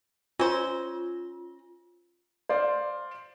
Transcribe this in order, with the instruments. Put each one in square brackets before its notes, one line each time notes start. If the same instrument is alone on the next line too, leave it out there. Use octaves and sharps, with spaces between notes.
[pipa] C#4 C5 [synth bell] F4
[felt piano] C5 D5 F5